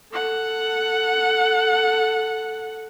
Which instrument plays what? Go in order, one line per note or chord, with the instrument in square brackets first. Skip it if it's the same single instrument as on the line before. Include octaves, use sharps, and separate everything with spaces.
[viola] A4 F#5